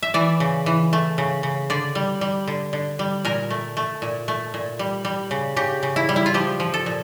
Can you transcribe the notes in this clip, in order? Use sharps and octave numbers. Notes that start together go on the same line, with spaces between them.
E5
E3 D5
C#3
E3
A3
C#3
C#3
D3 D5
G3
G3
D3
D3
G3
A#2 A#4
A3
A3
A#2
A3
A#2
G3
G3
C#3
C#3 G4
C#3
E4
G3
E4
F4
F3 G4
F3
A4
A#2